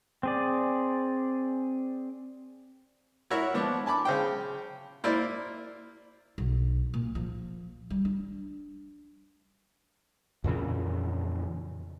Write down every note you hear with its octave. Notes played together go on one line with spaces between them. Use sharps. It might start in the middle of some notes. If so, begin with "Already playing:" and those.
C4 G#4 D5
E4 F#4 A#4 C#5 E5
F3 B3 D4
G#5 A5 B5 D6
C#3 C5 G5
A#3 E4 C5 D5
B1
A#2
F3
G3
D4
F2 A#2 C#3 E3